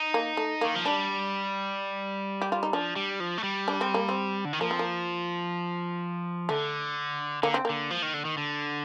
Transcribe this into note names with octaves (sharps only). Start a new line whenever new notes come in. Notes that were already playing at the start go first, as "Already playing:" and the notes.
Already playing: D#4
A#3
A3
D#3 A#3
F3
G3 D4
G4
F4
D#4
F3 D4
G3
F3
A3
G3
D4
C4
A#3
C4
D3
D#3
F3 A#3
C4
A#3
D3 A3
D3 A#3
C4
D3 A#3
F3
D#3
D3
D#3
D3